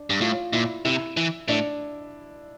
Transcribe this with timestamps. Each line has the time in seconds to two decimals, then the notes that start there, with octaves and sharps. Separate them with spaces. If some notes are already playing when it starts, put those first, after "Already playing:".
Already playing: D4
0.10 G2
0.21 A2 F4
0.53 A#2 E4
0.85 C3 E4
1.17 E3
1.48 A2 D4